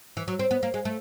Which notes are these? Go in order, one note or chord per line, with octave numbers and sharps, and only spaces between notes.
E3
F#3
C4
B3
A#3
G#3
A3